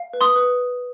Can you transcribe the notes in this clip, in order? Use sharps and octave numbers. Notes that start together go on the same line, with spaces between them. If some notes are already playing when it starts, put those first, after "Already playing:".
Already playing: F5
B4
C6 D#6
B4